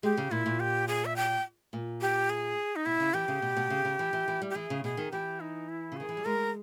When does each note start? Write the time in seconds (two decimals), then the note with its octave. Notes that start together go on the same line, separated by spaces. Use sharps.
0.03 G#3 G4
0.17 C#3
0.31 A#2 E4
0.46 A#2
0.60 G4
0.88 G#4
1.05 E5
1.16 G5
1.73 A#2
2.01 G4
2.30 G#4
2.76 D#4
2.86 B2 E4
3.00 C#3
3.14 E3 G4
3.28 C#3
3.42 B2
3.57 B2
3.70 C#3
3.85 C#3
3.99 E3
4.13 E3
4.28 E3
4.42 G3
4.50 G4
4.55 E3 G#4
4.70 C#3
4.84 B2 G#4
4.97 D#3
5.12 E3 G4
5.40 D#4
5.69 E4
5.92 C#3
5.97 D#3 G#4
6.09 E3
6.17 G3
6.25 G#3 A#4